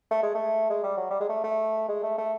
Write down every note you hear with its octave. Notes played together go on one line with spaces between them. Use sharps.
A3
G#3
A3
G#3
G3
F#3
G3
G#3
A3
A3
G#3
A3
A3